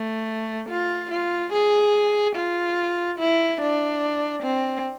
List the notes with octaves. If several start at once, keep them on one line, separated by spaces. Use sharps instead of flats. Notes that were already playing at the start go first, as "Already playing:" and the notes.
Already playing: A3
F4
F4
G#4
F4
E4
D4
C4